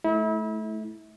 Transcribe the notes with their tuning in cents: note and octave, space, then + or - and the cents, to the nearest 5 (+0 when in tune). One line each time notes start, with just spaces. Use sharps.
A3 -25 E4 -35